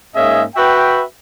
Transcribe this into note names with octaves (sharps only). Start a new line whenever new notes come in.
G#2 A#3 C#4 G#4 D#5 E5
F#4 B4 E5 G5